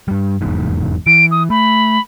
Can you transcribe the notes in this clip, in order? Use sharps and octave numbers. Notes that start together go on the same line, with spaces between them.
G2 G3
F1 E2 G#2
E3 D7
D#6
A3 B5